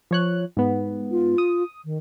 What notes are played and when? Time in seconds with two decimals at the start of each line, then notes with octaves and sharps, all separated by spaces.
0.11 F3 C#5 F#6
0.57 G#2 B3
1.11 F4
1.38 D#6
1.85 D#3